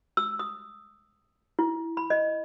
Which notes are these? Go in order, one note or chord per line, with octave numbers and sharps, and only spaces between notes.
E6
D#6
E4
B5
D#5